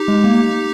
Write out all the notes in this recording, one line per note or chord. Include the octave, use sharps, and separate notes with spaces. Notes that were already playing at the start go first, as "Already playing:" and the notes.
Already playing: D#4 G4
G#3
A#3